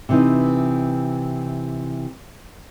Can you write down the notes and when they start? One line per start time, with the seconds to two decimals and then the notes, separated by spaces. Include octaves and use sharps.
0.09 C3 E3 D#4